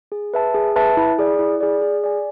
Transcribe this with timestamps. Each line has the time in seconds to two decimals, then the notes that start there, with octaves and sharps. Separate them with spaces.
0.12 G#4
0.34 B4 E5 A5
0.54 G#4
0.76 B4 E5 A5
0.97 E4
1.18 G#4 D5
1.39 E4
1.60 G#4 D5
1.82 G#4
2.04 D5 G#5